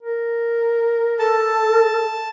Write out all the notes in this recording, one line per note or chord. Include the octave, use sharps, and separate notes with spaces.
A#4
A4 A5